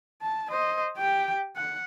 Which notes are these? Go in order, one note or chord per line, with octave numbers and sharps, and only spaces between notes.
A5
C5 D#5
G4 G5
F#5